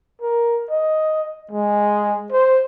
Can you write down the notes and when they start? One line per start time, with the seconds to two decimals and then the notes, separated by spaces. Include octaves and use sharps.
0.21 A#4
0.70 D#5
1.51 G#3
2.32 C5